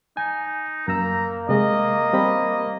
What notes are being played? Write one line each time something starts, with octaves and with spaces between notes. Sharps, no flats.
D#4 G#5
F#2 A#3 A#5 E6
C3 G#3 D#5
G3 C4 B5